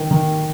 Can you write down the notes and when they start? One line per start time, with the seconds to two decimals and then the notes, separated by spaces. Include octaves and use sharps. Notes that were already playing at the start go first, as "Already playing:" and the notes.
Already playing: D#3
0.11 D#3